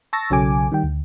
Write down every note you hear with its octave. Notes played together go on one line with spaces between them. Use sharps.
A5 C#6 E6 A6 A#6
B1 C#3 F#3 A4 G#5 D6
D#3 G3 G5
D2